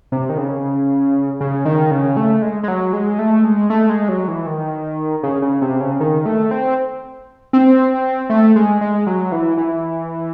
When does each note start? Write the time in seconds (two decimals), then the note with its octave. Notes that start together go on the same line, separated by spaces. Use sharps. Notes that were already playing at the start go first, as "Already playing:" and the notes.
0.12 C3
0.29 D#3
0.38 C#3
1.41 C#3
1.65 D#3
1.91 C#3
2.17 A3
2.42 G#3
2.63 G#3
2.68 F#3
2.93 G#3
3.19 A3
3.45 G#3
3.70 A3
3.89 G#3
4.09 F#3
4.28 E3
4.46 D#3
5.23 C#3
5.42 C#3
5.61 C3
5.81 C#3
6.00 D#3
6.26 A3
6.51 C4
7.53 C4
8.30 A3
8.56 G#3
8.81 G#3
9.07 F#3
9.32 E3
9.57 E3